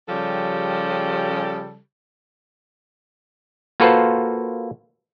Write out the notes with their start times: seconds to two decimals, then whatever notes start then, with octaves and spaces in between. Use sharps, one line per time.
0.09 C#3 F3 G3 C#4 G4 A4
3.80 A#3 F4 F#4 A4 B4 C5